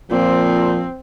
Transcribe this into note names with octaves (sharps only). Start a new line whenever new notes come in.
A#2 F3 C4